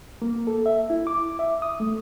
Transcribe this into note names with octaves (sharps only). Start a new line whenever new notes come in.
A#3
A4
E5
E4
D6
E5
D#6
A3